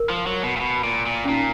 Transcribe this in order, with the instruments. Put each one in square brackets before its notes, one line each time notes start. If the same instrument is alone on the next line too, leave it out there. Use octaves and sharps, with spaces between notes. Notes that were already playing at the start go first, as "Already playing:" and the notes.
Already playing: [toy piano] A#4
[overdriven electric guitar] F3
F#3
B2
A#2
B2
A#2
A#2
[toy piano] C#4
[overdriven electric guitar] A#2 [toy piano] D#4